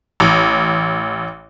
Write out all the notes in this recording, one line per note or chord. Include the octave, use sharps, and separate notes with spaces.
A1